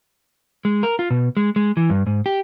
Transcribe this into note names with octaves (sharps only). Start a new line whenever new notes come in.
G#3
A#4
F4
B2
G#3
G#3
E3
G2
G#2
G4